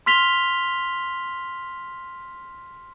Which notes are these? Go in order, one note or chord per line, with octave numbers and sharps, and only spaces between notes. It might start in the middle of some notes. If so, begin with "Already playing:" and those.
C6 F6 B6 F7 G7